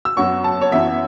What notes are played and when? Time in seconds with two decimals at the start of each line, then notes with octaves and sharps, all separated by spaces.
0.05 E6
0.17 F#2 F#3 B3 C#6
0.44 A5
0.61 C#5
0.71 F#2 E3 B3 E5